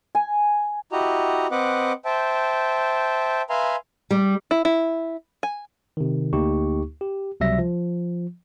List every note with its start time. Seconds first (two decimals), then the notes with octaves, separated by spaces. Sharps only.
0.15 G#5
0.92 E4 F#4 G4 D#5 A#5
1.51 C4 B4 D#5 F#5 D6
2.05 C5 E5 G5 A5
3.50 B4 E5 F5 G#5 A#5 C6
4.11 G3
4.51 E4
4.65 E4
5.43 G#5
5.97 C3 D#3
6.33 D2 A#3 D#4 G4 C#6
7.01 G4
7.40 C#2 C3 F#3 G3 E5 A#6
7.59 F3